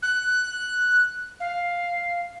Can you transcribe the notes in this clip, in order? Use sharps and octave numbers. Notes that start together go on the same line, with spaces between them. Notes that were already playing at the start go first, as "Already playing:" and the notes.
F#6
F5